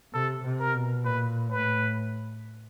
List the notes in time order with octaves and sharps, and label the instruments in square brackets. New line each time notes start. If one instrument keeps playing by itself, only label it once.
[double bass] C3 [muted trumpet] A4
[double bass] C3
[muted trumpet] A#4
[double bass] B2
[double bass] A#2 [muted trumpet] B4
[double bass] A2 [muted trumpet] B4